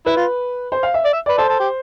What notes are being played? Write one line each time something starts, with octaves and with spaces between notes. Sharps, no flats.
E4 B4
F4
C5
F5
E5
D5
E5
B4 D5
A4 C5
A4
G4